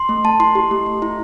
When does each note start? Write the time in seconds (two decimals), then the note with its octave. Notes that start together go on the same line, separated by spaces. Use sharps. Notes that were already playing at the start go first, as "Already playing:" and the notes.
Already playing: C6
0.09 A3
0.24 A3 A5
0.40 E4 C6
0.55 G4
0.71 A3
0.86 A3
1.02 E4